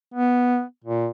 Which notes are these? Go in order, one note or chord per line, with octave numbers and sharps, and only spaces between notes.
B3
A#2